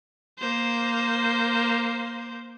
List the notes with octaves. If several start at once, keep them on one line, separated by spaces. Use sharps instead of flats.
A#3 C5